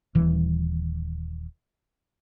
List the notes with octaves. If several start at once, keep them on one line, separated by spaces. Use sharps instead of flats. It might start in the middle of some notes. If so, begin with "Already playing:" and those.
D#1 E3